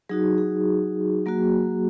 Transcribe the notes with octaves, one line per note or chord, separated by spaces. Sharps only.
F#3 D#4 F#4 G#4
G#4
F#3 A#3 F#4